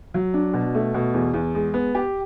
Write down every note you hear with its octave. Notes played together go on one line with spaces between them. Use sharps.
F#3
D4
B2
A3
B2
E2
E2
G#3
B3
G4